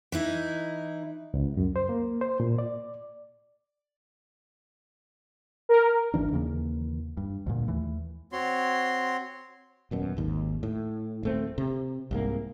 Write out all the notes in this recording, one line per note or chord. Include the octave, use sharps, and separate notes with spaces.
E3 D#4 E4
C#2
F#2
C5
A#3
C5
A#2
D5
A#4
G#1 F2 E3 D4
D#2 C#3 E3 A#3
G2
D2 G2 A#2
D#2 E3 A3
C4 F#4 C#5 C6
D#1 F#2 B2
G#1 D#2
A2
D#1 A3 C4
C3
C2 G#2 A#3